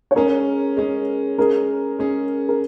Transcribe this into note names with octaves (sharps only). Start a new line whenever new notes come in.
C#5
G#3 C#4 G#4 A#4
G#3 C#4 G#4
G#3 C#4 G#4 A#4
G#3 C#4 G#4
A#4